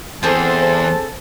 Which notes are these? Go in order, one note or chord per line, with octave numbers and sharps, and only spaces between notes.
E2 C4 G#4 A4 C5 A5